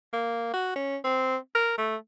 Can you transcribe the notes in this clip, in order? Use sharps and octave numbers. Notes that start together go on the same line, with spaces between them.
A#3
F#4
C#4
C4
A#4
A3